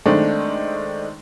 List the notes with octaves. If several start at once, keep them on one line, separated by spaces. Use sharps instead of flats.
D#3 G#3 A3 C4 D4